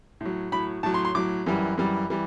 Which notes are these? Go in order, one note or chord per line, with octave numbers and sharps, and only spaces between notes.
A2 F#3
A2 F#3 B5
A2 F#3 A5
C6
C6
A2 F#3 D6
F#2 E3 G3
F#2 E3 G3
E3 G3